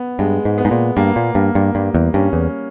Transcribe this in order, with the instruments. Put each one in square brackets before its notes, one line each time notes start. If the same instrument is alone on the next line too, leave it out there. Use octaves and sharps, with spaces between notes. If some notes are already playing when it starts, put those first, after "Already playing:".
Already playing: [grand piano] B3
[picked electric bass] G2 [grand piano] G#3
[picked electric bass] G#2
[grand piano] B3
[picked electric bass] G#2
A#2
[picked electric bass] G2 [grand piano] A#3
[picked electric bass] A#2
[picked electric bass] G2 [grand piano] A#3
[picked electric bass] G2
[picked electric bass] G2 [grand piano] G3
[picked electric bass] E2
[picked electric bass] G2 [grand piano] C#4
[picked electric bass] E2